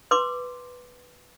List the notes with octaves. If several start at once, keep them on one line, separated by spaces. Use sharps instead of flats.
B4 C6 D6